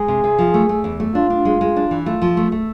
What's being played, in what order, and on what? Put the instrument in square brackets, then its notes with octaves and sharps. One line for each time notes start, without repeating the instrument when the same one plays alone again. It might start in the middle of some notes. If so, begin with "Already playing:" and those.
Already playing: [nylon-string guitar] G#3 [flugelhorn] G#4
[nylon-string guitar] C3
C3
F3
A3
A3
E2
A3
[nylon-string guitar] D4 [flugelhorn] F4
[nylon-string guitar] D4
G#3
G#3
D4
E3
[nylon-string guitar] A3 [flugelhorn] F4
[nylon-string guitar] F3
A3
A3